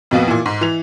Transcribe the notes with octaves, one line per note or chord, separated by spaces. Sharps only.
F2 B2 A#3 B3
A#2 E3
G#2
E3 F7